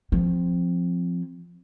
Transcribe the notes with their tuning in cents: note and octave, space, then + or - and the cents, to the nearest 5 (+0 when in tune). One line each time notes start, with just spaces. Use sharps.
F3 +0 C4 +0